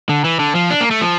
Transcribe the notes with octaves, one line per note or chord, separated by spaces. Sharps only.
D3
E3
D3
F3
D4
A#3
A3
F3